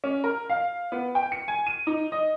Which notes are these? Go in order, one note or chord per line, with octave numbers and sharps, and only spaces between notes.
C#4
A#4
F5
B3
G5
C#7
G#5
D#7
D#4
D#5